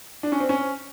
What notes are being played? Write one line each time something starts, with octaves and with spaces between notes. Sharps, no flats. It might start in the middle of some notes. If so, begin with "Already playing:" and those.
D4
C#4
C4
C#4